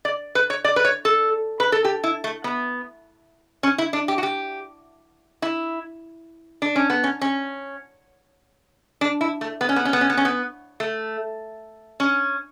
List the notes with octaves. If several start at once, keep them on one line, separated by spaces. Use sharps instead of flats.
D5
B4
C#5
D5
B4
C#5
A4
B4
A4
G4
E4
A3
B3
C#4
E4
D4
G4
F#4
G4
E4
D4
C#4
B3
C#4
C#4
D4
E4
A3
B3
C#4
B3
C#4
B3
C#4
B3
C#4
B3
A3
C#4